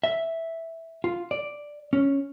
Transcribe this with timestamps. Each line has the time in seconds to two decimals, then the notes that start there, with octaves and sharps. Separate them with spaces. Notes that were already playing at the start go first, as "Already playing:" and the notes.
0.04 E5
1.04 F4
1.31 D5
1.93 C#4